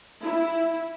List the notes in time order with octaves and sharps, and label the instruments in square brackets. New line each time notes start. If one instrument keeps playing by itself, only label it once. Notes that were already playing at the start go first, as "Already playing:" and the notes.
[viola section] E4